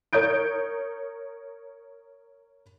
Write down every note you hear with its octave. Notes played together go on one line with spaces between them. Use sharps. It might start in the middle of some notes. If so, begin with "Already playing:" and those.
A#4 C#5 D#6 G6 D7